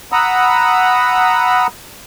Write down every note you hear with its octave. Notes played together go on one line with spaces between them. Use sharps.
F#5 A#5 B5 D#6 E6